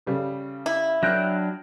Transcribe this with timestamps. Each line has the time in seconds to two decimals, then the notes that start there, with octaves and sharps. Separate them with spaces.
0.06 C#3 G3 A4
0.66 E4
1.03 F#3 D4 G5 F6 F#6 A#6